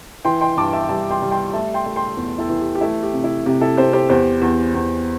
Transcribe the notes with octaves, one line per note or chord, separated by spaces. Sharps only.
E3 G5 C6
G5 C6
G2 A5 D6
E5 A5
G3 E5 A5
G5 C6
G3
G5 C6
A3 E5 A5
G5 C6
A3
G5 C6
E2
E4 A4
E3
G4
G4
A3 E4
G4
C3
E4
C3 G4
E4 A4
C3 G4 C5
G4 C5
E2 G4 C5
E2
E2